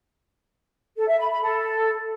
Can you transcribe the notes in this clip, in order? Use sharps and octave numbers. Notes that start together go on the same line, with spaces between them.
A4
E5
B5
B5
A4